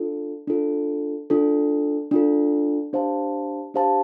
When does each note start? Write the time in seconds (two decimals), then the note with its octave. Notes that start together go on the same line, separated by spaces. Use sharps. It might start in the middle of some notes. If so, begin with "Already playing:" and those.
Already playing: D4 F4 A4
0.47 D4 F4 A4
1.30 D4 F4 A4
2.11 D4 F4 A4
2.93 D4 G4 C5 F5 A5
3.74 D4 G4 C5 F5 A5